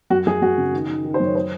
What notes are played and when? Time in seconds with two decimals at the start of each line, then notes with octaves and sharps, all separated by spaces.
0.10 F#2 F#4
0.26 F#2 G#4
0.42 F#2 F#4
0.58 C#3
0.72 D#3
0.88 D#3
1.05 D#3
1.14 C5
1.20 F#2 C#5
1.35 C5